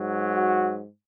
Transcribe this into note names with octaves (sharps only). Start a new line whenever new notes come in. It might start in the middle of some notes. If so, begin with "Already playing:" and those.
Already playing: G#2 F#3
F#4